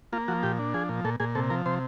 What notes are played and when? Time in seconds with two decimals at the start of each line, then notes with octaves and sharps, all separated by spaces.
0.13 A#3 F4
0.28 F3 F#4
0.43 A#2 G4
0.59 D4
0.74 F3 G#4
0.89 A#2
1.04 A#2 A4
1.20 A#2 G#4
1.35 C3 A4
1.50 F3 A#4
1.66 C3 C5